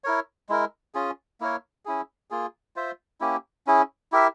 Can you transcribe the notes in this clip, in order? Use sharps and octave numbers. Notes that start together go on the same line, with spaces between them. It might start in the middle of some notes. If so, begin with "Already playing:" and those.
E4 A#4 C#5
G#3 E4 A#4
C#4 F4 G#4
A#3 E4 A#4 C#5
C#4 E4 G#4
A#3 F4 G#4
F4 C5 E5
A#3 C#4 E4 G4
C#4 E4 G#4
E4 G4 A#4 E5